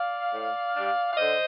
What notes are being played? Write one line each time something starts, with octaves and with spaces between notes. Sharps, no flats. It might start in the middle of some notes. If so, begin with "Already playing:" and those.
Already playing: D5 F5
A2
G3 D4
F5
D3 C5 D#5